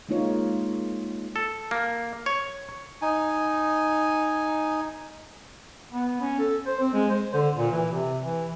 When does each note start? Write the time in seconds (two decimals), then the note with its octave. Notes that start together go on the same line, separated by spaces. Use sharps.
0.09 G#3 A#3 D#4 F4 C#5
1.36 A4
1.71 A#3
2.26 C#5
3.02 D#4 G#5
5.92 B3
6.21 C#4
6.39 A4
6.67 C5
6.79 C4
6.93 G#3
7.11 C5
7.34 D3
7.57 A#2
7.72 E3
7.92 C3
8.23 E3